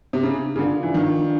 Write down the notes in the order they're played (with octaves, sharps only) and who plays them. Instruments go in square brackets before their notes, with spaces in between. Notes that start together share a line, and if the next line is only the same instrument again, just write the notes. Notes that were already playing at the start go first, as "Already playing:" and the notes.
[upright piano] C3
[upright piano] C#3 [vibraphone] D4
[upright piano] C#3
[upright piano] D3 [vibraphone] F4 A#4 D5 F5
[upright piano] E3
[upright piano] D#3 [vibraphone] D4